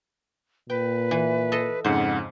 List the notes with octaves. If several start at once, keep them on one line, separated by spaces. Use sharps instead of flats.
A#2 B4 G5
E3
A4 D#5
F2 G#2 C#3 C5 F#5